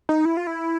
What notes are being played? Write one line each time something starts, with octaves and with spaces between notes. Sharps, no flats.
D#4
E4
F4
E4